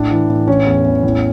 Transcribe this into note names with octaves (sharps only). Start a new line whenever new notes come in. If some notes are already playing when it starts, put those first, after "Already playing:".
Already playing: A2 D4
E3
A2
E3 C#4
E2
E2
A2